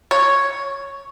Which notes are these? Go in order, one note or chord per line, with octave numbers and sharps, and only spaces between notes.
C#5